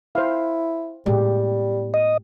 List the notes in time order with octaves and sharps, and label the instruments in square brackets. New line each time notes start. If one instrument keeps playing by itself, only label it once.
[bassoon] E4 [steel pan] C5 F5
[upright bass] A2 B3 [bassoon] G3 [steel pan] G#3 G4
[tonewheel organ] D#5